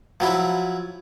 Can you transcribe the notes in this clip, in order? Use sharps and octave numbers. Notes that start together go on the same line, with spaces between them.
F3 F#3 E4